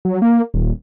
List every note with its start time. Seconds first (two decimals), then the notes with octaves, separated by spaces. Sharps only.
0.05 F#3
0.22 A#3
0.54 D#1